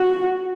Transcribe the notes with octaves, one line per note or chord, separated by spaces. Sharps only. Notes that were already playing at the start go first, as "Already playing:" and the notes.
Already playing: F#4